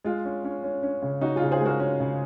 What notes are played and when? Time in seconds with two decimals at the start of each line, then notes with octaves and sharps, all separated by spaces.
0.04 G#3 F4
0.25 C#4
0.44 C#4
0.64 C#4
0.83 C#4
1.02 C#3
1.21 C#4 D#4 F#4
1.36 F4 G#4
1.42 C#3
1.51 G#4 C5
1.60 G#3
1.66 F#4 A#4
1.80 C#4
2.00 C#3